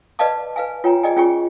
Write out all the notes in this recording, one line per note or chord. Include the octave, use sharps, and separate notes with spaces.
B4 D5 D#5 F5 A5 D6
B4 F5 G#5
F4 C#5 G5 G#5 A#5
G#4 D5 D#5 G5 G#5
C#4 F4 G#4 G5 G#5 C#6